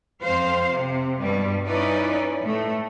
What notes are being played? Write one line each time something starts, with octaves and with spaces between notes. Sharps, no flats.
F2 C4 C5 F5
C3
G2 B2 G3
C#4 D#4 E4 B4 C#5 D5
A2 A3